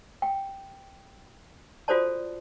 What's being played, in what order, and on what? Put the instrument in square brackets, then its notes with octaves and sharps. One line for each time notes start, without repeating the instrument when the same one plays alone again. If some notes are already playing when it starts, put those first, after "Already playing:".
[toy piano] G5
F4 F#4 A4 C5 D5 A5